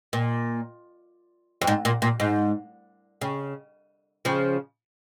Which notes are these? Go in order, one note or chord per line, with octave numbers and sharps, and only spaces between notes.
A#2
F2
G#2
A#2
A#2
G#2
C#3
C#3 F3